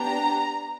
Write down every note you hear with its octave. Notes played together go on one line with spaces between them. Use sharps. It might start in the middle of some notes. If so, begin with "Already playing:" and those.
Already playing: B3 D4 G4 A#5